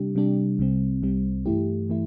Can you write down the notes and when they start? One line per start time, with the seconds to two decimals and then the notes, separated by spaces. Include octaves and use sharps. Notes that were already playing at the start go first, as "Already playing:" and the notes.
Already playing: C3 G3 D4 G4
0.15 C3 G3 D4 G4
0.59 C2 C3 G3 C4
1.02 C2 C3 G3 C4
1.46 G2 E3 A3 E4 G4
1.90 E3 A3 E4